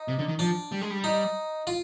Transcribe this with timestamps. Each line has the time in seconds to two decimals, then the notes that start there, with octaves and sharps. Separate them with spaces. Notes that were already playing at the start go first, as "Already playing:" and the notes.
Already playing: D#4
0.08 C3
0.19 D3
0.28 D#3
0.39 F3 D4
0.72 G3
0.81 G#3
0.90 G3
1.04 D#4
1.67 F4